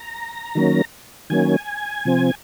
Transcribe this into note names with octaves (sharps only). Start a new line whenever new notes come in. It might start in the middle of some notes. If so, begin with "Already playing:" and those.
Already playing: A#5
D#3 F#3 A#3 C#4
D#3 F#3 A#3 C#4 G#5
C3 F3 C4